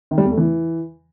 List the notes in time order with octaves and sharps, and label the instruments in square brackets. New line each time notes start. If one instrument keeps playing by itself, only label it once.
[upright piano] D#3
G3
E2
A3
E3